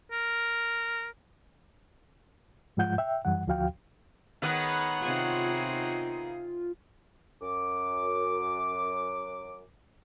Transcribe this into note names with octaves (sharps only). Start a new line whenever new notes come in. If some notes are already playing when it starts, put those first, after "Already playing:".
A#4
G#2 F3 G#3 F4 F#5 G6
E5 G5
F#2 E3 G3 F#5
D2 F3 F#4 F5 G5
D#3 B3 G#4 B4 C#5 F#5 F#6
C3 D#4 F4 G#4
F#2 D6